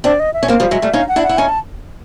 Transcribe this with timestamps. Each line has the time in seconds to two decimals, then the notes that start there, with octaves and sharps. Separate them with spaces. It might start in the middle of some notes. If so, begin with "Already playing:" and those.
0.04 C4 D4 D5
0.20 D#5
0.34 E5
0.43 C#4
0.48 A#3 C4 F5
0.60 F3 G3
0.71 F#3 G#3 E5
0.82 G3 A3
0.93 C#4 D#4 F5
1.08 F#5
1.16 D4 E4
1.23 F#5
1.29 E4
1.38 C#4 D#4 G#5
1.49 A5